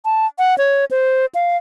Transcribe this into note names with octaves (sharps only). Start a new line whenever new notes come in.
A5
F#5
C#5
C5
F5